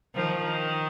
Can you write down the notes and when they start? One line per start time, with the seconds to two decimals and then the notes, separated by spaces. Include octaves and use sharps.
0.15 D#3 F3
0.43 D#3